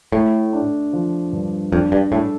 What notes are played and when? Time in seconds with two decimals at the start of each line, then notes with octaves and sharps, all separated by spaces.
0.12 A2 A3
0.53 D4
0.93 F3
1.33 G2
1.72 F2 D4
1.92 G2
2.12 A2 A4